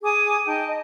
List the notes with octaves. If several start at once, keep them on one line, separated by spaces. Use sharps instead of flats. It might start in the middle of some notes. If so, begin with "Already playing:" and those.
G#4 G#5 D6 D#6
D#4 G5 A5
D#5